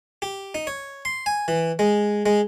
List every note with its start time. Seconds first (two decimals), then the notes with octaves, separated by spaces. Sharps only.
0.22 G4
0.55 D#4
0.67 C#5
1.05 C6
1.26 G#5
1.48 E3
1.79 G#3
2.26 G#3